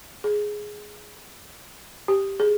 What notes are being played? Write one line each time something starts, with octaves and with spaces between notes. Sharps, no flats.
G#4
G4
G#4